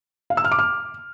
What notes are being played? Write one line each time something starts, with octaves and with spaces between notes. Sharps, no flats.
F5
E6
F6
D6
F6